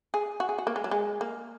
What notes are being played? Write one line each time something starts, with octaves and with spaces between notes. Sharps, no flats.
G#4
F#4
G#4
F#4
A#3
G#3
F#3
G#3
A#3